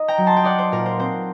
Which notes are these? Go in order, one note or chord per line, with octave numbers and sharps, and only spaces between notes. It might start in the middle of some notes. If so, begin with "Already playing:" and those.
Already playing: D#4 D#5
G5 A#5
F#3
A5 C6
G5
D#4 D5 F#5
C5
A#2 A#4
C5
C4 C5